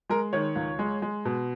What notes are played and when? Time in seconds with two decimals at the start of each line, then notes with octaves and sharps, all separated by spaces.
0.10 G#3 A#4
0.33 D#3 C#5
0.56 C#2
0.79 G#3
1.02 G#3
1.25 B2